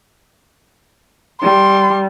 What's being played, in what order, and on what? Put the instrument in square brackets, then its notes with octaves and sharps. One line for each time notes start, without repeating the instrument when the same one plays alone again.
[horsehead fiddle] G3 [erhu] C6